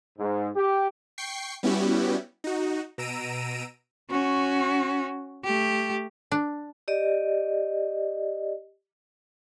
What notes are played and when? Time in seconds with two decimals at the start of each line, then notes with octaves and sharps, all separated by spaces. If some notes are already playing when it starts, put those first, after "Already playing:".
0.18 G#2
0.55 G4
1.18 G5 C#6 C7
1.63 G3 B3 C#4 E4 F#4 G4
2.44 D#4 F#4
2.98 B2 A#5 E6 D7 D#7
4.10 C#4 F#4
5.44 A3 G4
6.32 D4
6.88 G4 D5 D#5